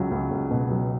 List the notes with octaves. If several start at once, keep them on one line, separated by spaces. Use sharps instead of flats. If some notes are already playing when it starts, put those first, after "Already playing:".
Already playing: C#2 F#3
C#2
C#2
B2
F#3